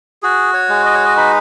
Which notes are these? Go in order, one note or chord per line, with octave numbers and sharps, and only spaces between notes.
F#4 G#4
C#5
G#3
D#5
C#5
D#5
D#4 B4